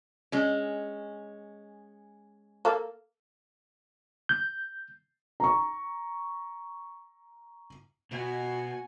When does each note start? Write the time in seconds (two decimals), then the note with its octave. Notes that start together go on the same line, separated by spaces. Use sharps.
0.32 G#3 C#4
2.65 A#3 A4 F5
4.29 G6
5.40 A#5 C#6
8.11 B2 F#4 G#5